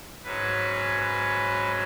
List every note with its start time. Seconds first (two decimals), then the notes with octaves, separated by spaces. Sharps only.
0.24 G#2 F#3 C#4 B4
0.99 B4